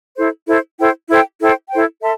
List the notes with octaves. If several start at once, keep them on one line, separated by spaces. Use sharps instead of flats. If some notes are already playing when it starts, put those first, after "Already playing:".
E4 A4 C5
E4 A4 C5
E4 A4 C5 G5
E4 A4 C5 G5
E4 A4 C5 G5
E4 A4 C5 G5
A4 E5 A5 C6